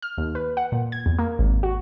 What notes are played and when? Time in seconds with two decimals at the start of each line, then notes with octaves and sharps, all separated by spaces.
0.02 F6
0.18 D#2
0.35 B4
0.57 F#5
0.72 A#2
0.92 G#6
1.06 E2
1.19 A#3
1.39 G#1
1.63 F#4